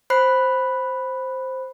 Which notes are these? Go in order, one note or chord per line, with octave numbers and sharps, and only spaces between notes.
C5 B5 F#6 C7